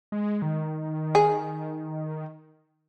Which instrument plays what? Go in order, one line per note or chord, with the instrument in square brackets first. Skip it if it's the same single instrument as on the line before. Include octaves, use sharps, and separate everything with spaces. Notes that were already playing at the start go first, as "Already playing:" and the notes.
[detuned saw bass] G#3
D#3
[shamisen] G#4